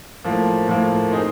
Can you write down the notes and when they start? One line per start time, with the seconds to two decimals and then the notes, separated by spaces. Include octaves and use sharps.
0.24 A2 F3 A#3
0.68 A2 F3 A#3
1.11 C4 D#4 G#4